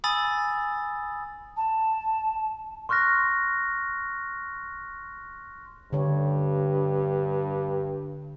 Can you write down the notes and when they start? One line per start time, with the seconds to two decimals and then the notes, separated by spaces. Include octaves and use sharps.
0.04 G#5 B5 D#6 E6 A6
1.57 A5
2.89 C6 C#6 F6 F#6 A#6
5.93 G2 D3 C#5